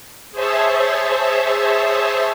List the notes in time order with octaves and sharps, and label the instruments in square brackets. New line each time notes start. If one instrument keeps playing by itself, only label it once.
[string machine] G#4 C5 C#5 E5 A5